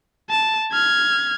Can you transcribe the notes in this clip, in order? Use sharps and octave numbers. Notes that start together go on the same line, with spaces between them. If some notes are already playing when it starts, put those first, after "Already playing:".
A5
F6 G#6